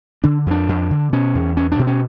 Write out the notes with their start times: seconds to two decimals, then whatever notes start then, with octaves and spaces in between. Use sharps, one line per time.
0.24 D3 D4
0.46 F2 D4
0.69 F2
0.91 D3
1.13 B2 C#4
1.35 E2
1.57 E2 C#4
1.72 D4
1.79 B2
1.87 C#4